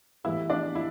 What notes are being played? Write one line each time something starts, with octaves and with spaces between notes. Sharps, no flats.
A2 E3 G3 E4 E5
D4 D5
E4